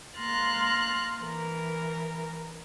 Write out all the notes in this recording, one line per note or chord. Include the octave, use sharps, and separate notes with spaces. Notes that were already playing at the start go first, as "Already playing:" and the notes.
A#3 A#5 C6 F6 F#6 A6
E3 A#4